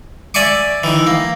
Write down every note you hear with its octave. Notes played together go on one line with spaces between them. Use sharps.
D5 E5 G#5 C#6 D6
D#3 E3
A#3